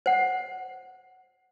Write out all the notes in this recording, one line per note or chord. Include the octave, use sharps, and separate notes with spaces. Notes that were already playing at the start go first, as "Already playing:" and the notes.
C5 F#5